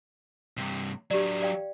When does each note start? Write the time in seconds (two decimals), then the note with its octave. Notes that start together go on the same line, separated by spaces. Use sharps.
0.57 G2 C3
1.11 F#3 D4 G4 D5
1.42 D5 F5 G5